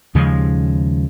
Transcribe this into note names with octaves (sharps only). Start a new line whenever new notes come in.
D#2 C#3 F3 G#3